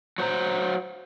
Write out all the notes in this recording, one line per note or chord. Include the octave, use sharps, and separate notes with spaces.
F#3 C5 A#5